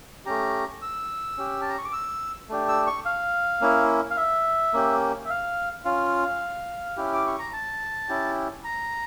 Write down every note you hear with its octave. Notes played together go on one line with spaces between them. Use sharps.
A3 C#4 G4 A#5
E6
C#4 G4
A5
A#5
C#6
D6
E6
A3 D4 G4
E6
C#6
F5
A#3 C#4 E4
F5
E5
A#3 C#4 G4
E5
F5
C#4 F4 F5
C#4 E4 G4
D6
C#6
A#5
A5
C#4 E4 G4
A#5